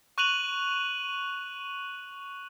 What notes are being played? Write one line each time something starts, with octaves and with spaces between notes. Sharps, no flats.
C#6 F#6 D#7 F7 F#7